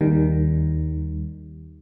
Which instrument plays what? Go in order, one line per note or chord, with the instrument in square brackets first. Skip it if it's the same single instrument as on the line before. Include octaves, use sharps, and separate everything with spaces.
[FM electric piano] D#2 D#3 G3